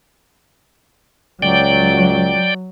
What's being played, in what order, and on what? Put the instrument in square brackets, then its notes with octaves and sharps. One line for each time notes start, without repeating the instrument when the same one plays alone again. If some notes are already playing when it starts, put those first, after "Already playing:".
[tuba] C#2 [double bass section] F#3 [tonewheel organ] D5 G5